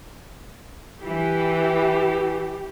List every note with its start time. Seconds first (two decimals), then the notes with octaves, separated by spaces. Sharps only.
1.04 E3 G4